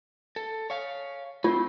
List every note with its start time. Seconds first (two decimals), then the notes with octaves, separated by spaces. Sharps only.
0.36 A4
0.70 C#5 F5
1.44 A3 C4 F4